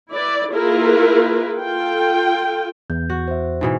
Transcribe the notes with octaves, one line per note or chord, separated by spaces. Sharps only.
E4 B4 D5
A#3 E4 F4 G#4 A#4 B4
F4 A4 G5
E2 G6
F#4
C5 E5
G#2 B2 E3